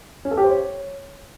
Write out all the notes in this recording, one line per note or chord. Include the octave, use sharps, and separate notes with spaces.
C#4
A4
G4
C5
C#5